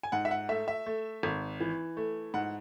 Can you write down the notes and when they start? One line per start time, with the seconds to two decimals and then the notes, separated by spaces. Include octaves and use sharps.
0.03 G#5
0.12 G#2 F#5
0.25 E5
0.31 F#5
0.49 A3 E5
0.68 E5
0.86 A3
1.23 G#1
1.60 E3
1.97 A3
2.34 G#2 F#5